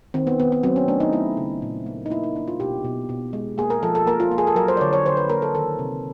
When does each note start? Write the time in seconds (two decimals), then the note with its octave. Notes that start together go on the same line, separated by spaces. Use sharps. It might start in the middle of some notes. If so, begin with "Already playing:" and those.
0.14 D#3 C4
0.27 B3
0.39 D#3 B3
0.52 B3
0.63 F#3 C4
0.76 C#4
0.88 A3 D4
1.00 D#4
1.13 A3 E4
1.37 C#3
1.62 A#2
1.86 A#3
2.06 D#4
2.10 A#3 E4
2.23 D#4
2.35 A#3 D4
2.48 F4
2.60 B2 G4
2.84 B2
3.09 B2
3.33 G#3
3.58 A#3 G#4
3.70 A#4
3.83 F3 A4
3.95 A4
4.07 A#3 A#4
4.20 F4
4.31 A#3
4.38 G#4
4.47 A4
4.56 F#3 A#4
4.68 C5
4.77 D5
4.81 D3 C#5
4.93 C#5
5.05 D3 C5
5.17 B4
5.29 A#3 A#4
5.42 A4
5.55 D#3 A4
5.79 C3